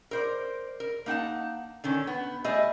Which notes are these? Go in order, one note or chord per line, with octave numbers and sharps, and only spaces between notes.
A#4 C5 D5
A#4
A#3 D#4 F#5 A5
D3 D#3 C#4
B3
G3 A3 E4 G#4 D#5